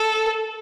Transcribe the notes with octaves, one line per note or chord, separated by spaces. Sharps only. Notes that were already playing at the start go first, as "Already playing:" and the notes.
Already playing: A4